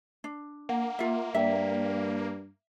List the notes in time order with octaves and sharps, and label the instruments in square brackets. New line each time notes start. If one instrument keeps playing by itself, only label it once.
[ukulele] D4
[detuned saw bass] A#3 [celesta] F#5
[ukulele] F4 E5
[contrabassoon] G2 [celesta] D5 G5 B6 [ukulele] E5